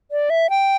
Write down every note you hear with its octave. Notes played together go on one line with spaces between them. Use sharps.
D5
E5
G5